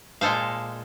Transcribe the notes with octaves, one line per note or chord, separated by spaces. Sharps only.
A#2 G#3 A4 C5 F5